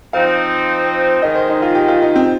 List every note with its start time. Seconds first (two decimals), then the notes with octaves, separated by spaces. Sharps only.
0.13 F3 C4 D#4 F5
1.22 G#2 D#3 G#3 D#5
1.35 C5
1.49 D#4
1.62 F4
1.75 G4
1.88 F4
2.02 D#4
2.16 C4